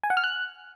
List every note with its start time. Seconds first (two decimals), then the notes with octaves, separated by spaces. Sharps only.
0.03 G#5
0.10 F#5
0.17 F6
0.24 F#6